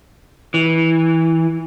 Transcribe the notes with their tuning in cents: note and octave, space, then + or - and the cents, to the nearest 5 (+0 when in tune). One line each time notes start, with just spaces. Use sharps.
E3 -15